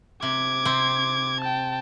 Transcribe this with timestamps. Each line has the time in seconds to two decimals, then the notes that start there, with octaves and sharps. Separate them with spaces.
0.23 C3 D6 G#6
0.65 C3 C4
1.40 G5 A5